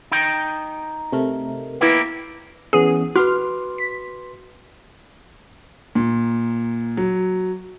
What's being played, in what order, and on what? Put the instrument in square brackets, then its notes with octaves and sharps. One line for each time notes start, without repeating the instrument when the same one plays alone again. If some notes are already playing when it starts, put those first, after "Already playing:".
[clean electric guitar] D#4 G5
[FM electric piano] C3 A3 A#4
[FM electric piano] E3 B3 [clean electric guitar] A#3 E4 G4
[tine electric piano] E3 B3 C#4 [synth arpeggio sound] G#4
[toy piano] F#4 [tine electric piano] B4 C6 D6 [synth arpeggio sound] F6
[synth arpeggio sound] B6
[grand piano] A#2
F#3